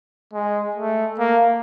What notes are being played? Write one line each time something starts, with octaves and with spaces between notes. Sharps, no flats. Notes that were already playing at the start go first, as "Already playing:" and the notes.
G#3
A3
A#3